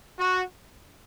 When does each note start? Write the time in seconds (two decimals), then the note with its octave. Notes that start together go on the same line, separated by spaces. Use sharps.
0.18 F#4